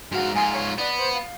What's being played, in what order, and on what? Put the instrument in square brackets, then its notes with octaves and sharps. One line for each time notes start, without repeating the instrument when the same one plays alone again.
[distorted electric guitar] G#2 F5 [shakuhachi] F#4
[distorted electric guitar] G#2 F4 [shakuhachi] G#5
[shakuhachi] C#5
[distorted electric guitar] B3 [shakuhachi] D5
[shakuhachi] C5
F5